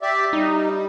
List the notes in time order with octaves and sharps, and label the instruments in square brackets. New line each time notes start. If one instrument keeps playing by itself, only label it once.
[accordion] G4 D5 E5
[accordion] G3 [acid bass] D#4